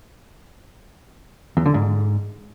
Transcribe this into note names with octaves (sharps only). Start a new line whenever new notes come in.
E2
D3
G#2